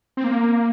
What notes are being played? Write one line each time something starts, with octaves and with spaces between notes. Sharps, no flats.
C4
A#3